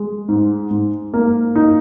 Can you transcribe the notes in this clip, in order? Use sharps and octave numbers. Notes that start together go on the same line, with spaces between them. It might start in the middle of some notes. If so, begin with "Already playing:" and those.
Already playing: G#3
G#2
G#2
A#3
D#4